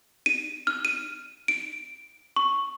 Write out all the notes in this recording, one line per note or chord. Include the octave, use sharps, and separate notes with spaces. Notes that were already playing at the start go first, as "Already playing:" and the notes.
D#7
F6
D#7
D7
C#6